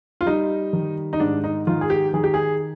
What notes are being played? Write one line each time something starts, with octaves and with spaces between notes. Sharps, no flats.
F4
G3 D#4
D#3
D#4
G#2 D4
D#4
D#3 F4
G#4
G4
D#3 G#4
G4
G#4